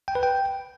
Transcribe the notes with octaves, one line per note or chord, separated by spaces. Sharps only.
G5
B4
G5